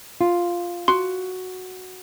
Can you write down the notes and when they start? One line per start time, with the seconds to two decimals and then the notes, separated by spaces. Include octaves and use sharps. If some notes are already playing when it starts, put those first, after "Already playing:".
0.21 F4
0.88 F#4 C6